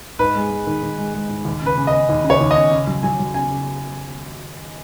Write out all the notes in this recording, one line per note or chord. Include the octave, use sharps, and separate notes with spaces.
G#2 B4
G#3
G#3
D#3
D#3
G#3
G#3
G#2
D#2
C#3 B4
C#3
D#5
C#4
D#2
C#3
C#5
D#2
D#5
C#4
C#3
F#3
F#3 G#5
F#3
C#3 G#5
C#3